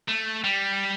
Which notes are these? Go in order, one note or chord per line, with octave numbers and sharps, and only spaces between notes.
A3
G3